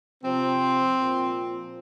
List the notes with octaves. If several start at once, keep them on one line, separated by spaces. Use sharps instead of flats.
C3 F3 C4
A#2 F3